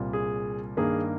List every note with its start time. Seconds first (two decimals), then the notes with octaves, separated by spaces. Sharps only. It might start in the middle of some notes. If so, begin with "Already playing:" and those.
Already playing: C2 A#2 G3 C4
0.13 G#4
0.77 G2 D#3 A#3 G#4